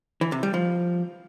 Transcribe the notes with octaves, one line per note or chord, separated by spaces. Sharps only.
E3
C3
G3
F3